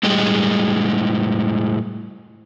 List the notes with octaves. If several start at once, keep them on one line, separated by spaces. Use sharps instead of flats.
A2 G3 G#3 D#5